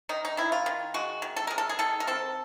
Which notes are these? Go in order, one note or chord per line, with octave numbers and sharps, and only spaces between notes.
D#3 D#4
D#4
D#3 E4
F4
D#3
G#3 F#4
D#3
A4
G#3 A#4
A4
G#4
D#3 A4
A#4
C4 A4